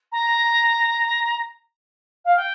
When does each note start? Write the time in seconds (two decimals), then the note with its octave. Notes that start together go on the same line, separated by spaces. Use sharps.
0.12 A#5
2.25 F5
2.37 G5